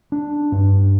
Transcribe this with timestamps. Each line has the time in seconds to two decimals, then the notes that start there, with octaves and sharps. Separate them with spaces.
0.12 D4
0.52 G2